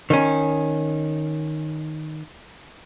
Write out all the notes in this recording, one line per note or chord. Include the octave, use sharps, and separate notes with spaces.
D#3 C#4